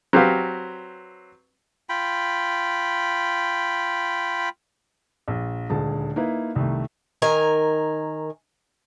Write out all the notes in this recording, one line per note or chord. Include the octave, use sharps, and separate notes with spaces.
F#3 C4 G4 B4 F5
F4 G5 B5
A#1
D#1 D2 G#3 A5
A#3 D#4 E4 B4
C2 D#3 A3
D#3 A#4 G#5